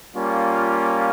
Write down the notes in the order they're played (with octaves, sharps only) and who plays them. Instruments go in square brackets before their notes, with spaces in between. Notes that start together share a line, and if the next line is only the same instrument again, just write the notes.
[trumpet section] G3 A#3 C#4 F4